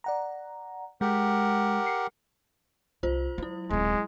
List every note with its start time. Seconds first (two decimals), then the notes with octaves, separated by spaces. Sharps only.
0.04 D5 F#5 A#5
1.01 G#3 G4 A#4 F#5
1.86 C7 C#7
3.03 C2 F4 C5
3.38 F#3 G#3 E4
3.71 D#1 G#3 C4